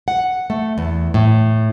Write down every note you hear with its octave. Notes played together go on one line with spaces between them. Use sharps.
F#5
A3
E2
A2